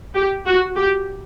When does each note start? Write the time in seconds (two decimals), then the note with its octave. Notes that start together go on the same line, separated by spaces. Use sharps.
0.15 G4
0.46 F#4
0.77 G4